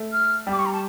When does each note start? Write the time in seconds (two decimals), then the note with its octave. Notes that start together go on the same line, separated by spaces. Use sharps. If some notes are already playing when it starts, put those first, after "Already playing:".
Already playing: A3
0.12 F6
0.47 G3
0.52 D6
0.59 C#6
0.66 A#5
0.73 A5